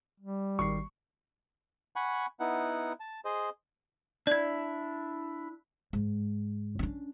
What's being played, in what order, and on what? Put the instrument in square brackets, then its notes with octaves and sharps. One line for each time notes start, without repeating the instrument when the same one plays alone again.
[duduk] G3
[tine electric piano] G#1 D#3 C7 [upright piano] C#6
[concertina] F#5 G#5 B5 C#6
B3 D#4 E4 F#5
A5
G#4 C5 D#5
[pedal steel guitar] D4 E4 [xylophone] D5 G#6
[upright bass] G#2
C#4 D4